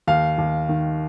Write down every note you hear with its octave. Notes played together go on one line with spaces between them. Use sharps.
D#2 F5
D#2
D#3